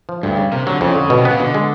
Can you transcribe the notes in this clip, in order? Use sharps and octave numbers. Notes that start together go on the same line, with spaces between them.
F3
D2 G2
C#3
C3 A#3
D3 F#3
F2 C#3
D3
B2
C3
C#3 B3
B2 D3
G#3